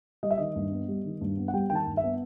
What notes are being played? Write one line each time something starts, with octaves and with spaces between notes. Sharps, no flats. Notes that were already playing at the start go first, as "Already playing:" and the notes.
G3 D#5
E5
D#3 D#5
G2
B3
G3
D#3
G2
B3
F#5
G3 G5
D#3 G5
A5
G2
E5
B3